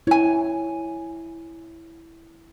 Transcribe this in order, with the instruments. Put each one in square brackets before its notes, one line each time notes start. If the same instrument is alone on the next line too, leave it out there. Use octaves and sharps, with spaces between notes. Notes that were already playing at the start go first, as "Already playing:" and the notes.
[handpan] E4 [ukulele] C#5 G#5